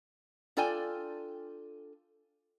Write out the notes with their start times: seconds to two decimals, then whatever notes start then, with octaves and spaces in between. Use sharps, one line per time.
0.57 D4 F4 A4 D5 G5 G#5